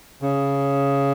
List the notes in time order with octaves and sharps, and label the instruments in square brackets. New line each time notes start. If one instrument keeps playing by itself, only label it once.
[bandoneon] C#3